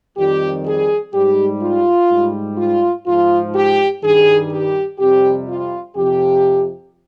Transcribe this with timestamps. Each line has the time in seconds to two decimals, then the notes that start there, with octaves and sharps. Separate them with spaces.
0.17 F2 D#3 G3 G4
0.66 G#4
1.14 G#2 G3 G4
1.62 F4
2.10 G#2 G3
2.58 F4
3.06 G#2 F3 F4
3.55 G4
4.02 G2 D#3 G3 G#4
4.52 G4
4.99 F2 C3 G3 G4
5.48 F4
5.96 F2 C3 F3 G4